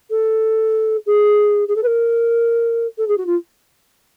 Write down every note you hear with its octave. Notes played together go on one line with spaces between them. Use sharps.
A4
G#4
G#4
A4
B4
A#4
A4
G#4
F#4
F4